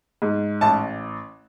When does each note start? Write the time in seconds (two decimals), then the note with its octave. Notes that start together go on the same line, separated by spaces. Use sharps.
0.22 G#2
0.61 A1 A5